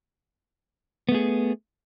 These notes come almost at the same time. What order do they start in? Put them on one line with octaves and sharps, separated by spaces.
B3 A3 G#4